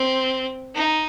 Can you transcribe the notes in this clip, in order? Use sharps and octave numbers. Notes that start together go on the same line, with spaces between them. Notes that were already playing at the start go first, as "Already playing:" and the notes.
Already playing: C4
D#4